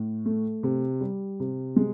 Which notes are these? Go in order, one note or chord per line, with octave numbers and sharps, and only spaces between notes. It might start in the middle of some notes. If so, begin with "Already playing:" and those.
Already playing: A2
A3
C3
G3
C3
G#3